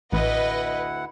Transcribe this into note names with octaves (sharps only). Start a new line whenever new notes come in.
A1 D2 E4 B4 D#5 F#5